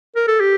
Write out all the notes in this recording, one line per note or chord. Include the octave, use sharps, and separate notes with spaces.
A#4
A4
G4